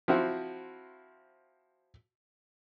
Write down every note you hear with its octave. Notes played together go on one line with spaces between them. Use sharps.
F3 C4 E4 F#4